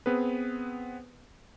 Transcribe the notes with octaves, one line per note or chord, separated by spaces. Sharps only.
B3 C4 G#4 B4